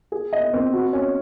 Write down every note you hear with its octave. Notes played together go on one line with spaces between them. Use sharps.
G#4
D#5
C4
F#4
C#4